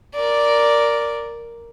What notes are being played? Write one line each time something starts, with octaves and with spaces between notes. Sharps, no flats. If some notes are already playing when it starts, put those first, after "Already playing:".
A#4 D5